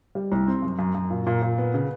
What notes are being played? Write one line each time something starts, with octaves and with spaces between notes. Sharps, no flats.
G3
C2
C4
F#2
F#2
F#2
A#2
A#2
A#2
B3
C#3